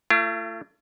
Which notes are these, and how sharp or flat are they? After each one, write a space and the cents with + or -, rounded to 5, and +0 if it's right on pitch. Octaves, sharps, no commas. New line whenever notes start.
A3 +25 F4 -45